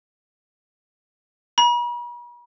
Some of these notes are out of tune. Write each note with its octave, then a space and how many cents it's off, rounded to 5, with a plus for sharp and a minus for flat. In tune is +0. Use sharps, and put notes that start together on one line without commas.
B5 -45